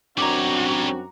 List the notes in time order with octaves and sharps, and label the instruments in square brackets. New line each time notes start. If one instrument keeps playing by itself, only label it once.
[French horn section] F#2 C4 D4 [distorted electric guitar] G3 C#5 [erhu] F#4 [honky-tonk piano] A#5 D6